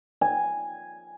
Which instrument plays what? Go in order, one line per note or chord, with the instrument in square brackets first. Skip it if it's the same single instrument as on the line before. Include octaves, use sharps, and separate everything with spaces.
[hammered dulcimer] G#5